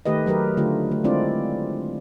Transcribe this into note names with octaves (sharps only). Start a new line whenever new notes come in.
D#3 A3 G4 B4 D#5
F#3 G4 A#4 B4
D3 A3 F4 G4
A3
G#3 C4 D4 E4 F4 D5